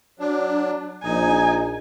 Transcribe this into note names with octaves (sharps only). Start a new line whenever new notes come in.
F#3 D4
A#1 D#4 G#5